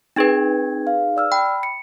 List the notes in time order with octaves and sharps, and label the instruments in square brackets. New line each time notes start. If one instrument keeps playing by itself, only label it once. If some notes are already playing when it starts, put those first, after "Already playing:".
[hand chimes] C4 G5 G#6 [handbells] D#4 G#4 B4
[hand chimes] F5
D5 E6 F6
[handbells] G5 [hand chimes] B5
[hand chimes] C#7